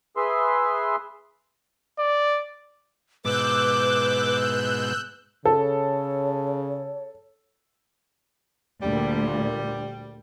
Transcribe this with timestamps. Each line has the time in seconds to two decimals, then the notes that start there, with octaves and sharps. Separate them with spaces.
0.17 G#4 B4 E5 C6
1.99 D5
3.25 G#2 B2 B4 D6 E6 F#6 G6
5.45 C#3 A4 C#5
8.82 D2 A#2 G3